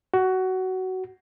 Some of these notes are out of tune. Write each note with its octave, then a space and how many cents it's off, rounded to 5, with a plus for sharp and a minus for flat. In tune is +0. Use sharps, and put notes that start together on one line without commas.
F#4 +15